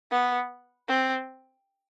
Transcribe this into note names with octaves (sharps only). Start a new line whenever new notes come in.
B3
C4